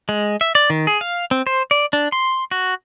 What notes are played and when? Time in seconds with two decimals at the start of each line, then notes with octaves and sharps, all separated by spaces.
0.09 G#3
0.41 E5
0.55 D5
0.70 D#3
0.87 G#4
1.01 F5
1.31 C4
1.47 C5
1.71 D5
1.93 D4
2.12 C6
2.51 F#4